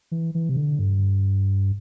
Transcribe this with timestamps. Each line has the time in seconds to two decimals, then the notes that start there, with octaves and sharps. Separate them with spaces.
0.11 E3
0.35 E3
0.49 C3
0.57 D3
0.79 G2